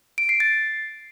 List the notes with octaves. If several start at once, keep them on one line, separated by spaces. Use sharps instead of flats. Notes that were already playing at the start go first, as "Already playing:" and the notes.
D7
C7
A6